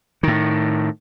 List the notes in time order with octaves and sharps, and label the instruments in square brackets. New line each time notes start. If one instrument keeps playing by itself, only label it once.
[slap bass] A2 D#3